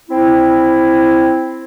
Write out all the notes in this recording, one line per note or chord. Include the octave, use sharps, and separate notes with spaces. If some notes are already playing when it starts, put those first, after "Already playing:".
C4 E4